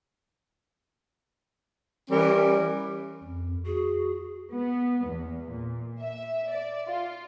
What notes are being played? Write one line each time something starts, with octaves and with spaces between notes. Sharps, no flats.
E3 G3 C#4 A#4
F2
F#4 G#4
B3
E2
A#2
E5
D5
F4